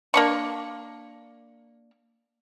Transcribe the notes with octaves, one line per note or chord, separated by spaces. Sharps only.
A#3 D4 C#6